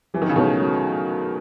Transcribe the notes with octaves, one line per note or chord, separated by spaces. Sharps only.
E3 F#3
D#3
C#3
B2 D#3 A3 C#4 G#4 C#5
F#3